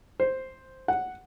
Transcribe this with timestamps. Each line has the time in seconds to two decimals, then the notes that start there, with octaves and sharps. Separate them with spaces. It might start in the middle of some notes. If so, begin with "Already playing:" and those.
0.20 C5
0.88 F#5